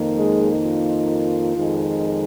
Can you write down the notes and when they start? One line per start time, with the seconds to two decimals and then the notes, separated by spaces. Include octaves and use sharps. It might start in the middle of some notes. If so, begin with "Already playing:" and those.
Already playing: F2 D#3 A#3 D#4
0.17 G#3 G#4
0.64 F4
1.56 F2 D#3 G#3